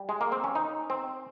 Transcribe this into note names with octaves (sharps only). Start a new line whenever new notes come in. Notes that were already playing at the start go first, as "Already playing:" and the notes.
Already playing: G3
G#3
A#3
C4
C#4
D#4
C4